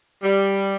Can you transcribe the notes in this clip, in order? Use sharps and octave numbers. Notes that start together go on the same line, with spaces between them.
G3